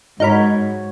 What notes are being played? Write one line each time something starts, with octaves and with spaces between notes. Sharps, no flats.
G#2 D#4 F#4 A#4 C#5 B5